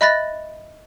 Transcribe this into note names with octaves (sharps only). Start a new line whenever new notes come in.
D#5 E5 B5 F#6 A6 A#6